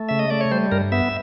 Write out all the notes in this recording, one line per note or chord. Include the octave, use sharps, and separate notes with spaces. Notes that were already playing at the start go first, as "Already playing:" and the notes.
Already playing: A3
C#3 E5
D#5
A3 D5
C#5
G3 C5
G2 A#4
B3 E5